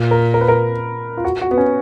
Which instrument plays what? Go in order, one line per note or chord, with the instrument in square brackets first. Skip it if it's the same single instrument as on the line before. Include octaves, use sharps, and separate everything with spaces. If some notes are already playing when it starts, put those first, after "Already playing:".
Already playing: [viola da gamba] A#2
[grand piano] A#4
A#4
B4
A#4
F4
F#4
F#4
B3
C#4